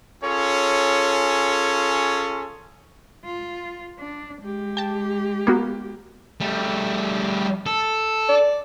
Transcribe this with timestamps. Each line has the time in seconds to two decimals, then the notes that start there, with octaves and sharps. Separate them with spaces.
0.24 C#4 F4 G#4 A4 C#5
3.24 F4
3.99 D4
4.42 G#3 G4
4.77 G5 A5
5.47 A#3 B3 F#4
6.40 G3 A3
7.66 A4
8.29 D5